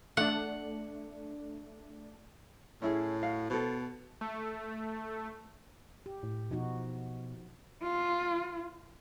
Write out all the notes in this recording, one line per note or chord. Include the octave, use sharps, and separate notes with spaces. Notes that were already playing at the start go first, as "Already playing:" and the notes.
A3 D4 F#5
A2 C#4 E4 G#4
F#4 F5
B2 A4 C5
A3
G4
A2
B2 F3 D#4 F#4
F4